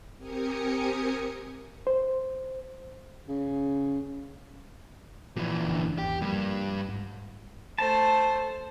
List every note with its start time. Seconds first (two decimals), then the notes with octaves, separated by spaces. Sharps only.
0.16 C4 G4 A#4 G#5 D#6 C#7
1.87 C5
3.28 C#3
5.36 A#2 E3 F3
5.67 F#1 D3
5.98 G#1 E2 G4
6.21 G2 F3 G3 A#3
6.88 G#2
7.78 A3 C5 A5